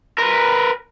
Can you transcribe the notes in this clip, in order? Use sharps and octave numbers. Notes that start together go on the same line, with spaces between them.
A#4 B4